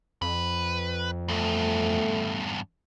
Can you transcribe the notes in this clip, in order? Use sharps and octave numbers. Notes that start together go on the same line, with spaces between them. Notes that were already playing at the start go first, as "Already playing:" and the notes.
F2 B4
E2 G2 A3